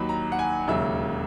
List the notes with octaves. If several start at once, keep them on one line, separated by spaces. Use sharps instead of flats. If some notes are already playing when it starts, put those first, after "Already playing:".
Already playing: D#2 D#3 F#3 B5
A#5
F#5
G#5
E1 D#2 C#3 F#3 E5